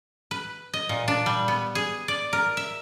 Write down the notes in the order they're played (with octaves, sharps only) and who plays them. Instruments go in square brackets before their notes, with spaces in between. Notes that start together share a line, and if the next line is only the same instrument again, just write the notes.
[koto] B4
D#5
A#2
D4
G3
B3
G#4
D5
A#4
E5